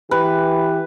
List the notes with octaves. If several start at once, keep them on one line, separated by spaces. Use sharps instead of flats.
E3 G4 B4